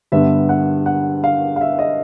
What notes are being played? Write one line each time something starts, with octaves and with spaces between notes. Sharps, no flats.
G2 D3 G3 B3 E5
F#5
F#5
F5
F5
E5
D#5